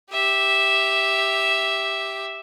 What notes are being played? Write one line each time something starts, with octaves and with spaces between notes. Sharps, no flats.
G4 E5